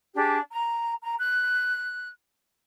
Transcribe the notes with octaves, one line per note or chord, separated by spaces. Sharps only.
D4 G4 G#4
A#5
A#5
F#6